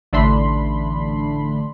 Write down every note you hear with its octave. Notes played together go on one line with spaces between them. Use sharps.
A1 D3 A3 D4 B5 C6